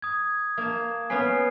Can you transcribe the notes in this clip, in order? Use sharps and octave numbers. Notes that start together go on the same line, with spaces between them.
D#6 G#6
A#3 A5
B3 C#4 B4 G#5 C7